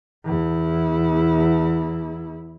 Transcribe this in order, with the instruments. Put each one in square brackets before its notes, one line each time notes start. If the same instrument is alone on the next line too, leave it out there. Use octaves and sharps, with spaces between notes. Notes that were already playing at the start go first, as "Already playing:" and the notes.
[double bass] E2 E4